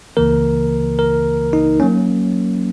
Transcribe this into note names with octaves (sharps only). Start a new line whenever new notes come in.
C#2 C#3 E3 A#3 A#4
A#4
D#4
F#3 A#3 C#4